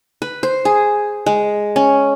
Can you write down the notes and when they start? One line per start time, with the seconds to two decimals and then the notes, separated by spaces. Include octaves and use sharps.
0.22 B4
0.43 C5
0.65 G#4
1.26 G#3
1.76 C#4